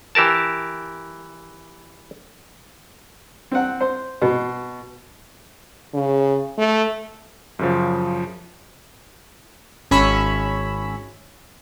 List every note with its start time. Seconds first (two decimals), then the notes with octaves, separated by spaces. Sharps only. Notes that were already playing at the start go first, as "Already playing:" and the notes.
0.15 E3 G4 A#4 A5
3.51 C4 F#5
3.81 C5
4.22 B2
5.94 C#3
6.58 A3
7.59 F#2 C#3 F3
9.91 G#1 C#4 C#5 B5 E6